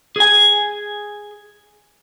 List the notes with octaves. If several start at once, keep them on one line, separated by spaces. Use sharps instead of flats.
G#4 G#5